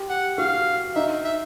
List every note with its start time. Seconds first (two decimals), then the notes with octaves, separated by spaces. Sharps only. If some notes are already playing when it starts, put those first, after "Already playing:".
Already playing: G4
0.09 F#5
0.38 F#4 F5
0.95 D#4 E5
1.24 E5